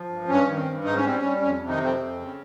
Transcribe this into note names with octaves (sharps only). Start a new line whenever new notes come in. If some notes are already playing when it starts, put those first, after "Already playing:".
Already playing: F3
G2
G2 C#4
D#3
C4
G2
G#2 D#4
C#4
G3 C4
C#4
G3
F2 C#4
C3
D#3 D#4
F2 C4
F2
C#3